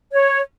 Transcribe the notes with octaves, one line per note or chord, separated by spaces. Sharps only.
C#5